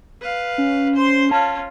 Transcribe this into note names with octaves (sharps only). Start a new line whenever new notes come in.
B4 F5
C#4
C5 C6
C#4 F4 A5